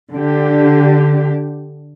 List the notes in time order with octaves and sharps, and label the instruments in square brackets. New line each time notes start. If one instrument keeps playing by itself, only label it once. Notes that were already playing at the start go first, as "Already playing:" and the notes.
[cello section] D3 D4 G4